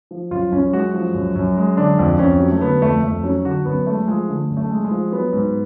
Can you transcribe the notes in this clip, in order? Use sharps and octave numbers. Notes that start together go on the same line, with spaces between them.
F3
F#2 F4
F#2 C#4
G#3 F#4
F3
F#2
F#2
G#3
D3 D4
F2
F2 C#4
F#3
A3
D3 B3
F2 A3
F2 A3
F#3 C#4
D3 F#4
F#2 B3
G#3 A3
F3 G#3
D3 A3
F#2
A3
G#3
G#3
F3
F#3 B3
G#2